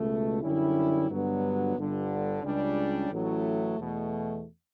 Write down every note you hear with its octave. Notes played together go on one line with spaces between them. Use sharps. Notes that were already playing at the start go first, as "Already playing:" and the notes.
Already playing: C#2 B2 A3
F#2 D3 G3 C#4 E4
G2 D3 F#3 B3
G1 G2 D3 G3
C#2 C#3 G3 D4
A1 A2 F#3 A3
E2 B2 A3